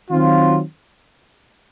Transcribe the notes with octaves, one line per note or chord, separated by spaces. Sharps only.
D#3 F#3 C4 F4